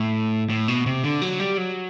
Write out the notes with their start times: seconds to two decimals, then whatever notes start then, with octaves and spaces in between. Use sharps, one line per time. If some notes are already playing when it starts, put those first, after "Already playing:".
Already playing: A2
0.50 A2
0.68 B2
0.86 C3
1.04 D3
1.22 F#3
1.39 G3
1.57 F#3